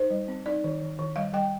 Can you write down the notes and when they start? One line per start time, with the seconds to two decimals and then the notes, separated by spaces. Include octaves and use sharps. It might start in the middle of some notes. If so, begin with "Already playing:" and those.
Already playing: D#4 C5
0.10 G3
0.28 C4
0.46 D#4 D5
0.64 D#3
0.82 D#3
0.99 D#3
1.16 G3 F5
1.33 G3 G5